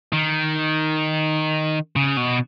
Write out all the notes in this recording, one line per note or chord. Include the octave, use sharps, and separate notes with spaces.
D#3
C#3
B2